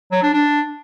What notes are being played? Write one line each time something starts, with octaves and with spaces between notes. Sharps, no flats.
F#3
D4
D4